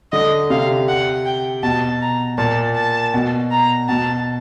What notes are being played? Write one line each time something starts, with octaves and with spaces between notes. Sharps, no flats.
D3 D#5
C3 F5
F#5
G5
B2 A5
A#5
A#2 A5
A5
B2
A#5
B2 A5